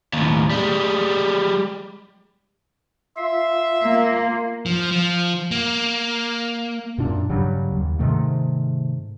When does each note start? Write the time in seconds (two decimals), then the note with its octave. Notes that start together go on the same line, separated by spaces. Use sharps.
0.13 D#2 A2
0.50 G3 G#3
3.17 F4 E5 F5
3.83 A#3
4.66 F3
4.91 F3
5.51 A#3
6.98 F#2 A#2 D4
7.29 G2 C#3 F#3 G3
7.72 D#2
7.99 G#2 C3 D#3 A3